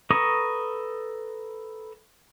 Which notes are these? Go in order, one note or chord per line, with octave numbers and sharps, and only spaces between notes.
A4 B4 A#5 C#6 D#6